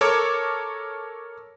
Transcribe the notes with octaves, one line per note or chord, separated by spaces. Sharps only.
A4 A#4 C#5 D6